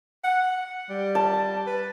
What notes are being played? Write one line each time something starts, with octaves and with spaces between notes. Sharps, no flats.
F#5
G3
A5
B4